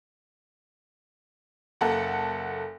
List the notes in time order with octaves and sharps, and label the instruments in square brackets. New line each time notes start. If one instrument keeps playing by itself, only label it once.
[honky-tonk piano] F#1 A#3 A4 F#5